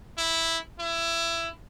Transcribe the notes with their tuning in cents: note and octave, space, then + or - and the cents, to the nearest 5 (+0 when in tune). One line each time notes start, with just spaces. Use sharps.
E4 -5
E4 +20